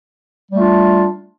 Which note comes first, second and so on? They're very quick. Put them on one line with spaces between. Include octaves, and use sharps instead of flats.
G3 A3 F4 D4